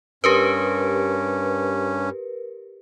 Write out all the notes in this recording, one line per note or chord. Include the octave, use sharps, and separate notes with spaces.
G2 C#4 G4 A#4 B4